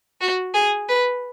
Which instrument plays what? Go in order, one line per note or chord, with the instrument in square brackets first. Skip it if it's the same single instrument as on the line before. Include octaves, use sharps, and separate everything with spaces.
[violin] F#4
G#4
B4